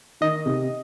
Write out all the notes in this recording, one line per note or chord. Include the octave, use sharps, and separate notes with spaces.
D#3 D#5
C3